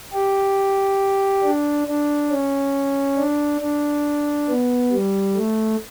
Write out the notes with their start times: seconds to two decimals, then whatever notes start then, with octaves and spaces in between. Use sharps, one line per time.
0.13 G4
1.43 D4
1.87 D4
2.31 C#4
3.17 D4
3.61 D4
4.49 B3
4.92 G3
5.36 A3